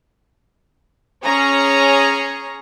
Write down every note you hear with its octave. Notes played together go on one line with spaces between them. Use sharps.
C#4 G#4 C#5 A#5